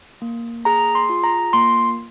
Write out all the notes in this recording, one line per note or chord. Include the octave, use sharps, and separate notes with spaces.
A#3
G#4 A#5
C6
F4
A#5
A#3 C6